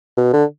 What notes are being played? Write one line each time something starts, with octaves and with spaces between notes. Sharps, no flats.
B2
D3